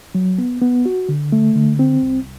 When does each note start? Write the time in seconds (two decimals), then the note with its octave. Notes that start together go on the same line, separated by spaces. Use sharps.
0.15 F#3
0.38 B3
0.61 B3
0.86 F#4
1.09 D3
1.32 A3
1.56 D3
1.79 C4
2.03 C2